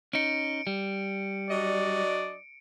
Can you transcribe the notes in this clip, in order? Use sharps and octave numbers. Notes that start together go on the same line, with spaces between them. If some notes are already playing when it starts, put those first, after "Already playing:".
C#4 D#4 C#7 D7
G3
F#3 D4 D5 D#5